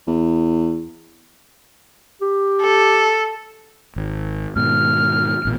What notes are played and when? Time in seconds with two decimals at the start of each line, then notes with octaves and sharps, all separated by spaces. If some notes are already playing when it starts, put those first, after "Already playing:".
0.07 E2
2.22 G4
2.62 A4
3.96 G#1
4.56 G#2 B2 D#3 F6
5.45 A1 A#2 B3